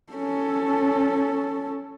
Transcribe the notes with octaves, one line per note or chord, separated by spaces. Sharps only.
C#4 A4